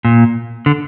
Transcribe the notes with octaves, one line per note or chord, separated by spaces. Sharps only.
A#2
D3